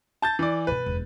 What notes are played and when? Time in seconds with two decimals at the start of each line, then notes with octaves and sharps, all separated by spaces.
0.22 A5 G6 A6
0.39 E3 D5
0.67 F#2 B2 B4
0.86 E1 F#2